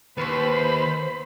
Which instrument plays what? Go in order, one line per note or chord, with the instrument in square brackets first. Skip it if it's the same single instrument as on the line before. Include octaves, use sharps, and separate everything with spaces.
[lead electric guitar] D#2 [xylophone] B4 C#6 [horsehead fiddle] C5 [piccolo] B5